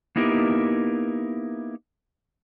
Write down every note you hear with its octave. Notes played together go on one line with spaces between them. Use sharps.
A#3 B3 D#4 E4 G4 A#4